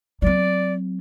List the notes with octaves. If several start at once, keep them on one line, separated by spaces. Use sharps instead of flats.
F#3 C4 D5